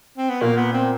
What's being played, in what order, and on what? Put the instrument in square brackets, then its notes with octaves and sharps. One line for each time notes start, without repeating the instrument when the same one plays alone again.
[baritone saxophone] C4
B3
[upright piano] A#2 [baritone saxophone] A#3
[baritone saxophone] B3
C4